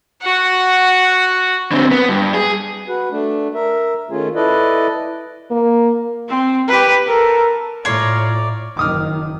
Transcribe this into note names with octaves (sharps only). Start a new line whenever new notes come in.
F#4 F#5
D3 C4
B3
G2
G#4
F#4 B4
A3 D4
A#4 E5
D#3 A3 C#4 F4 G#4
E4 A4 B4 D5 D#5
A#3
C4
G4 B4
A4 A#4
A2 F4 C#5 D5 A#5 C6
F#1 D#3 D6 D#6 F6